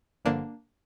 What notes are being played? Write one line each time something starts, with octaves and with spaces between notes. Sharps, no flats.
G1 G2 D3 F3 A#3 D4